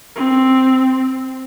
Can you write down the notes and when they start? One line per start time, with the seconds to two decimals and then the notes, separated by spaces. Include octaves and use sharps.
0.16 C4